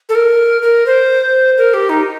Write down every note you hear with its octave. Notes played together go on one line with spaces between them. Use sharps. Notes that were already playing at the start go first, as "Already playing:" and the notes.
A4
A#4
A#4
C5
A#4
G4
D#4